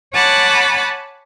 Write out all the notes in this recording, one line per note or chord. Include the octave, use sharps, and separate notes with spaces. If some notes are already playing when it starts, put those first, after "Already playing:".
C#5 F#5 G#5 A5 B5 D6